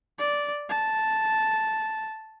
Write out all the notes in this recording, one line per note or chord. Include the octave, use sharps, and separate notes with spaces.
D5
A5